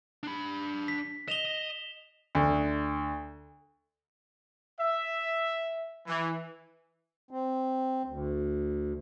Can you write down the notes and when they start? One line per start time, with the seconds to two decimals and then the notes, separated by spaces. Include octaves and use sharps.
0.23 D4 B5
0.88 B6
1.28 D#5 E7 F7 G7
2.35 D2
4.80 E5
6.07 E3
7.31 C4
8.05 D2